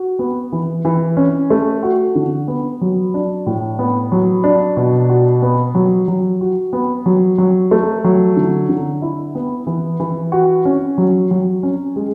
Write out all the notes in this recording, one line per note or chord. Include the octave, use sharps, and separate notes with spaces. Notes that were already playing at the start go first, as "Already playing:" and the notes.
Already playing: F#4
B3
E3
E3
C#4
A3
F#4
D3
B3
F#3
D4
A2
B3
F#3
D4
B2
F#4
B3
F#3
F#3
F#4
B3
F#3
F#3
A3
F#3
D3
D3
E4
B3
E3
E3
F#4
C#4
F#3
F#3
C#4
G#3